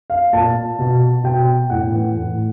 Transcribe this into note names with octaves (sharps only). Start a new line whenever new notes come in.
F5
A#2 A5
B2
B2 G5
A2 F#5
E3
A2